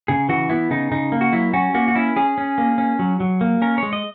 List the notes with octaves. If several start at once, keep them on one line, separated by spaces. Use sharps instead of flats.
C#3 G#4
E3 F#4
B3 E4
C#3 D#4
C#3 D#4
A#3
F#4
F#3 E4
C#4 F#4
A#3 F#4
F#4
C#4 E4
C#4 G#4
C#4
A#3
C#4
F#3
F#3
A#3
C#4 A#4
G#3 C#5
D#5